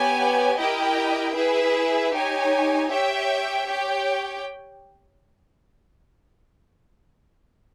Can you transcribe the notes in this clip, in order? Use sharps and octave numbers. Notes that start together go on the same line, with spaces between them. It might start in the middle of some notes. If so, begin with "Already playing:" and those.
Already playing: B3 G4 C#5 G#5
E4 G4 A#4 D#5 G5
E4 G#4 B4 E5
D#4 G4 C#5 G#5
G4 C#5 E5 G5
G4 C#5 G5